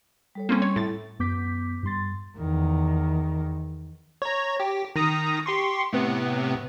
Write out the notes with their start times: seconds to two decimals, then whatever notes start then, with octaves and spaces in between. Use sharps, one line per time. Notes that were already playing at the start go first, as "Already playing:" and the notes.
0.35 G3 A4 C#5
0.49 G3 A#3 C4 C#4 C6
0.62 C#5
0.76 A2 A6
1.19 F#2 B3 D6 G6 B6
1.83 G2 G3 C6 A6
2.37 E2 D#3
4.22 C#5 A#5
4.60 G4
4.96 D#3 A#5 D#6
5.46 G4 C6 C#6
5.93 A2 C3 B3